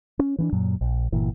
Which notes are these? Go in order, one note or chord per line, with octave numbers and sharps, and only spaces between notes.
C#4
E3 C#4 D4
F#2 A#2 F#3
A#1
G1 A#2 E3